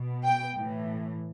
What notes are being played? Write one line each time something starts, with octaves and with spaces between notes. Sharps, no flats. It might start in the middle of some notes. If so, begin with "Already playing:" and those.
Already playing: B2
G5
A2 E3